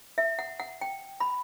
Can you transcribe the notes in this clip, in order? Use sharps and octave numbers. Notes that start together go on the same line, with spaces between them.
E5
F#5
F#5
G5
B5